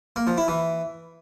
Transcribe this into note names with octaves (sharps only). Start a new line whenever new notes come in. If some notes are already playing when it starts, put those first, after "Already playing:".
A#3
F3
E4
E3